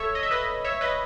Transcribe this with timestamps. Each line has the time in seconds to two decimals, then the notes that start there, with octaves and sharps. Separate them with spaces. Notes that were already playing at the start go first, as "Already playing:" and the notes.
Already playing: A4 C#5 E5
0.15 D#5
0.23 E5
0.31 B4 D#5
0.64 C#5 E5
0.81 B4 D#5